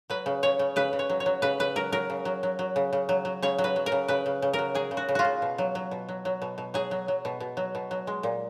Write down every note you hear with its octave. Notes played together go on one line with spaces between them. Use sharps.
F#3 B4
C#3
C#3 C#5
C#3
C#3 B4
C#3
C#5
F#3
C#5
F#3
C#3 B4
C#3 B4
F#3 A#4
F#3 A#4
C#3
F#3
F#3
F#3
C#3
C#3
F#3
F#3
C#3 C#5
F#3
B4
F#3
A#4
C#3
C#3 B4
C#3
C#3
A#4
F#3
F#3 G#4
C#3
F#4
C#3
F4 F#4
C#3
B2
F#3
F#3
B2
F#3
F#3
B2
B2
F#3 G#4
F#3
F#3
B2
B2
F#3
B2
F#3
G#3
A#2